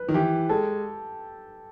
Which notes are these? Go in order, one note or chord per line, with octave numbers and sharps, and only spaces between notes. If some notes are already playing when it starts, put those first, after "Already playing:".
Already playing: B4
D#3
E3 G4
G#3 A4